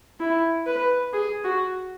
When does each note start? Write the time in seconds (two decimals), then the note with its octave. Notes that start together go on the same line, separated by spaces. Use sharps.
0.20 E4
0.67 B4
1.13 G#4
1.44 F#4